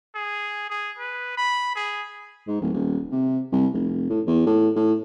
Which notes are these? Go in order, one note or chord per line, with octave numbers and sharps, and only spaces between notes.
G#4
G#4
B4
B5
G#4
G#2
D1
D#1
C3
C2
F1
A2
E2
A2
A2